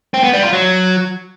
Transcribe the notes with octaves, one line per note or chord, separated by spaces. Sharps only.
C4
B3
G3
F4
F#3